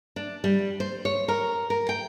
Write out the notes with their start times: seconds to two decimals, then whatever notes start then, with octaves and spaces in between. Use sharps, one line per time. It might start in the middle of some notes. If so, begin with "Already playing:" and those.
0.16 D4
0.44 G3
0.80 C5
1.05 C#5
1.28 A#4
1.70 A#4
1.89 G5